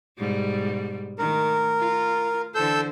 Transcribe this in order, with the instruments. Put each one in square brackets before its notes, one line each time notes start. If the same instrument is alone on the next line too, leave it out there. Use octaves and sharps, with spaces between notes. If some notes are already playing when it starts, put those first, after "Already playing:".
[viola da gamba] G#2 B2 G3
[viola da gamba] D#3 A3 [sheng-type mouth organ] A#4
[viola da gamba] F4
[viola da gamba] D3 E3 C5 [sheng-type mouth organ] A4 E6 G6